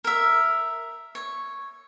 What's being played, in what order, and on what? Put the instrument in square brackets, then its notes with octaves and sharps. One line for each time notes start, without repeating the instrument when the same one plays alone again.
[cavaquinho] A#4 E5
C#5